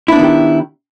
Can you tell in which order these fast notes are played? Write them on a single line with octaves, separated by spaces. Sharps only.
E4 D4 B3 D#3 G4